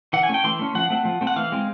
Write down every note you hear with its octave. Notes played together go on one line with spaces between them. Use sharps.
E3 F#5
G#5
A3 C#4
G5
E3 C6
A3 C#4
F3 F#5
A3 C4
F3
A3 C4
F#5
E3 F5
G#3 C4